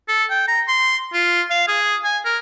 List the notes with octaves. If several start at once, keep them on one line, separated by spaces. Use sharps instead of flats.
A4
G5
A#5
C6
F4
F5
G#4
G#5
A#4